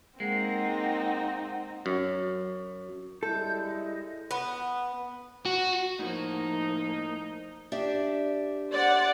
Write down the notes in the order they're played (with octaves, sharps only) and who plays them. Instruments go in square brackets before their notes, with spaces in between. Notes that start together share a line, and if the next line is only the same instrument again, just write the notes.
[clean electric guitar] G#3 [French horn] A#3 [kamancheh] C4 D#4 [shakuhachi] F#5
[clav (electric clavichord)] F#2
[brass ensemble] G3 G#3 E4 [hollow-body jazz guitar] A4 [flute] G6
[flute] D#5
[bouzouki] B3
[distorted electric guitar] F#4
[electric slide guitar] A2 A#3 [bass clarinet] F3 [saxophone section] D#4
[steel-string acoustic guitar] D4 G4 E5
[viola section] C5 D5 F#5